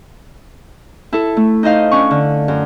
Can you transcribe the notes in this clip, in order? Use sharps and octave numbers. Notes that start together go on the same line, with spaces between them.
E4 A4
A3
D#4 C5 D#5 F5
C#4 D4 C#6
D3
F#2